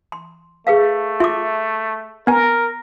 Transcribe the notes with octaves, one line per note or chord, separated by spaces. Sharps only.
C6
A3 G#4 B4 F5
F4 E5 D6
B3 A#4 G#5